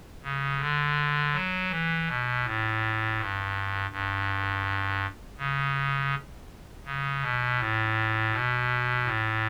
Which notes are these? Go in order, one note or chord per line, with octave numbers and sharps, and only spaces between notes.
C#3
D3
F#3
E3
B2
A2
G2
G2
C#3
C#3
B2
A2
B2
A2